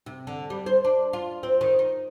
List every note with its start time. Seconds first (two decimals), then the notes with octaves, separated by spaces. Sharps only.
0.06 C3
0.27 D3
0.50 G3
0.66 C5
0.85 D4
1.13 F4
1.43 C4
1.61 D#3
1.79 D#4